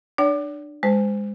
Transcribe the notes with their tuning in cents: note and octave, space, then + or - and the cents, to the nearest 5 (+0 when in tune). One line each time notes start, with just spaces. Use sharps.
D4 +25 D5 -40 G5 -40
G#3 -20 C5 -30 A5 +0